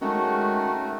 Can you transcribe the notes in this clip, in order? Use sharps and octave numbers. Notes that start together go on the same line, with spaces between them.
D#3 G#3 A3 C#4 F#4